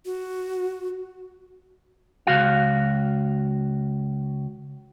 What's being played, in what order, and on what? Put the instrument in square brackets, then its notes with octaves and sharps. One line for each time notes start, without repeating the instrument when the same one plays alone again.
[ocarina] F#4
[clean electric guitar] C#2 F#4 F5